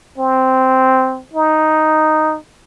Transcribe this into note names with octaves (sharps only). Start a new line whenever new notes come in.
C4
D#4